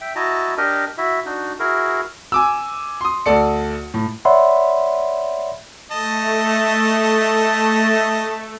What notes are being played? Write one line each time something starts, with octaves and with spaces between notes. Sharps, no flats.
E5 G5
E4 F#4 D#5 A5 A#5
D4 G4 A#4 D#5
E4 F#4 E5
D4 D#4 F#4
E4 F#4 G#4 A#4
G#5 D6 E6
C6 D#6
D2 A4 D5 C#7
A2
C#5 D5 E5 F#5 B5 C6
A3 D#5 A5